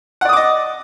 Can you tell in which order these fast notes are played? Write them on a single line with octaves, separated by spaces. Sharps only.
F#5 D5 D#6 D6 D#5